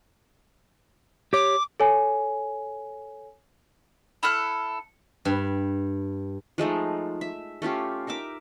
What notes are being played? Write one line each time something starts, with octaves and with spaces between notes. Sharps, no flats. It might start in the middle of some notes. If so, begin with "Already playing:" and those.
G4 C#5 D6
A4 C#5 G#5
E4 A4 F6 F#6
G2
F3 G#3 A3 D#4
E5
A3 C#4 F4 G4
D#4 A#4 E5 D6